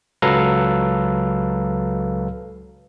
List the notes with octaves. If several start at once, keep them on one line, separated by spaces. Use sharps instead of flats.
C#2 F#3 A4 B4 F5 A#5